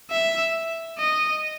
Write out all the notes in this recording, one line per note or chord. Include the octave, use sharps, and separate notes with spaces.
E5
D#5